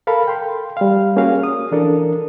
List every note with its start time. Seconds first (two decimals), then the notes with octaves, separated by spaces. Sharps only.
0.07 A4 A#4 F5 B5
0.27 G5 C6
0.77 G3 F5
1.16 A#3 C#4 F#4 G#4 F5
1.43 D#6
1.72 E3 D4 A4 A#4